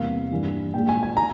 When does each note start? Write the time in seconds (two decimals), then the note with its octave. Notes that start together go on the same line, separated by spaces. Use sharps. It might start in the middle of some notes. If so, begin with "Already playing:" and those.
Already playing: E2 C3 G3 A#3 F5
0.31 G2 E3 A#3
0.74 A#2 G#3 G5
0.89 G#5
1.03 G#5
1.17 A#5